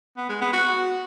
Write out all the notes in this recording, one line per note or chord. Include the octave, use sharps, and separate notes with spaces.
B3
G#3
B3
F#4